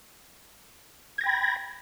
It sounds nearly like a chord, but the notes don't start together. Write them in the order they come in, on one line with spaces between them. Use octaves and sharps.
G#6 A#6 G5 B5